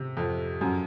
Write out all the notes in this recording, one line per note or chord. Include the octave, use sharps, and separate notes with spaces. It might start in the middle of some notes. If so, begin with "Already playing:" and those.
Already playing: C3
F2
F#2